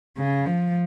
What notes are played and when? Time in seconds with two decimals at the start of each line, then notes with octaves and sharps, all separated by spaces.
0.18 C#3
0.46 F3